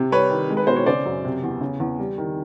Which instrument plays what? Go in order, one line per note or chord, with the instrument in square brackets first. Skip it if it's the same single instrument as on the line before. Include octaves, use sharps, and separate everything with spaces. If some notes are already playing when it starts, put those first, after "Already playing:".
Already playing: [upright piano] C3
G3 B4 C#5
D#3
G#3
B4
B2 C5
C#5
C#3 C5 D5
F#2
C3
E2
C#3
E2
G3
D#3